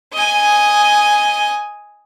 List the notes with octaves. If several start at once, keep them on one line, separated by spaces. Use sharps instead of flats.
D#5 G#5